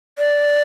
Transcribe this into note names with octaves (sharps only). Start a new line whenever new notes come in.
D5